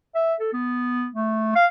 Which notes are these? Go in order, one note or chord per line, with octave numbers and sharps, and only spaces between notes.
E5
A4
B3
A3
F5